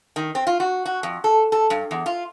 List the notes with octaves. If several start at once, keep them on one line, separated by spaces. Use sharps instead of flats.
D#3
C4
F4
F#4
F#4
F2
A4
A4
G2
E2
F4